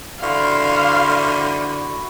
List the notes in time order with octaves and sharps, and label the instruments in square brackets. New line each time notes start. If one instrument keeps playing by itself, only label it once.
[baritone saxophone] D3 [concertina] E4 F#4 [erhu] F5 [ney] C6